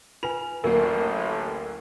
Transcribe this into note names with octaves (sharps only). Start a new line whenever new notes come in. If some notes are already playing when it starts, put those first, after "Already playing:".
F4 B4 G#5 F7
A1 D2 F#3 A#3 A#4